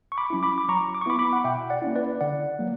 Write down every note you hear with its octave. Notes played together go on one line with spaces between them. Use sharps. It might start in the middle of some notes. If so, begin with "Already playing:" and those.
C#6
B5 D6
F#3 C#4 E4
B5 D6
D6
F#3 A#5 C#6
D6
C#6
B3 E4 B5 D6
B5 D6
F#5
B2 E5 G5
D5 F#5
A#3 C#4 E4
B4 D5
D3 D5 F#5
F#3 A#3